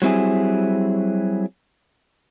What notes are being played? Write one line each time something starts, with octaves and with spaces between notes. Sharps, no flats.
F#3 G3 C4 E4 G#4